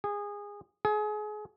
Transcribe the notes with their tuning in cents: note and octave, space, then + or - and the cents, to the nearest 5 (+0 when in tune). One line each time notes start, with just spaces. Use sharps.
G#4 -20
G#4 +30